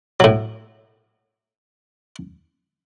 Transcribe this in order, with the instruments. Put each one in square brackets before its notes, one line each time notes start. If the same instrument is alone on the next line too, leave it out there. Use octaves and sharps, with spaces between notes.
[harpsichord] A2 F#3